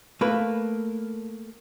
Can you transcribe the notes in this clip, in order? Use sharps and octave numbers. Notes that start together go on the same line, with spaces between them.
A3 A#3 B4